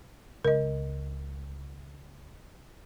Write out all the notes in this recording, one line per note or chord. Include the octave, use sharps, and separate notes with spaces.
C#2 A#4 D#5